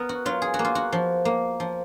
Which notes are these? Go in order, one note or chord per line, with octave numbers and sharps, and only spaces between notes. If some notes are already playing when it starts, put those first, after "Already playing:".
Already playing: B3 A#4
F#4
F#3 F4
G#4
F#4
A#3
F4
F#4
F3
A#3
F3